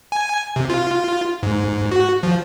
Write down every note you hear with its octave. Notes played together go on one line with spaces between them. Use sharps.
G#5
C3
F4
G#2
F#4
F3